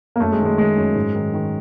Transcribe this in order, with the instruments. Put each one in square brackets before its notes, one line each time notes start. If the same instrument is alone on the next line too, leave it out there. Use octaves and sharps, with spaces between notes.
[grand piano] A#3
F#2 A3
G#3
D#3
G#3
D#3 G#3
F#2
G#2
D#3
D#3